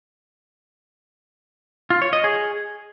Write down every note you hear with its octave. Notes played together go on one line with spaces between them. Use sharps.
F4
C#5
D#5
G#4